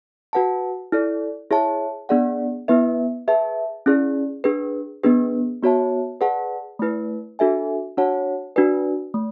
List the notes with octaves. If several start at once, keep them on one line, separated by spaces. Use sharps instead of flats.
F#4 B4 F#5 A5
E4 A4 D5
E4 G#4 C#5 E5 A5
B3 D4 G#4 D5 F#5
B3 E4 B4 E5
G#4 B4 E5 A5
C#4 E4 G#4 D5
D4 G#4 B4
B3 D4 G#4 B4
B3 F#4 C#5 E5 A5
G#4 B4 D5 F#5 A5
A3 E4 B4
D4 F#4 A4 E5 G#5
D4 F#4 C#5 F#5 A5
D4 F#4 B4 D5 G#5
A3